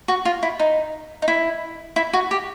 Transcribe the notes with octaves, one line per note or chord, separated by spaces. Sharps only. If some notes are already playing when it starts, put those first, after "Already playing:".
F#4
F4
E4
D#4
D#4
E4
E4
F#4
G4